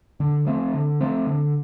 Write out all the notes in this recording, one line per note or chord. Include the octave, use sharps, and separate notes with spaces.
D3
F3 A3 C4
D3
F3 A3 C4
D3